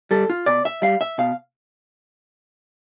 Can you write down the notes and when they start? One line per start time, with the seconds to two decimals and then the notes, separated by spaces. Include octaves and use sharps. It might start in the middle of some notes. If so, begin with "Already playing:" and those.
0.11 G3 A4
0.30 F4
0.46 B2 D5
0.65 E5
0.82 G3 F5
1.01 E5
1.18 B2 F5